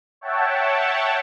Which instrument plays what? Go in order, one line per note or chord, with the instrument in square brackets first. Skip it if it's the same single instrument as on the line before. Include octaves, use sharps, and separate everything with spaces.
[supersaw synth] C#5 E5 F#5 G5 A5